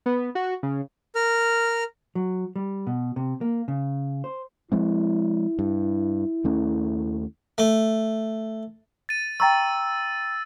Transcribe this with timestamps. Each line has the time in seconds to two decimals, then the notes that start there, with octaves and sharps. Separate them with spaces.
0.06 B3
0.35 F#4
0.63 C#3
1.15 A#4 F6
2.15 F#3
2.56 G3
2.87 B2
3.16 C3
3.41 A#3
3.68 C#3
4.24 C5
4.72 F3 G#3 C4 E4
5.59 G2
6.44 D#2 A3 C#4
7.58 A3
9.09 A6 D#7
9.40 G5 A#5 C#6 E6 A6